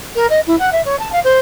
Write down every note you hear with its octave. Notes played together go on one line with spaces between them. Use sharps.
A#4
D#5
E4
F#5
E5
C#5
A5
F5
C5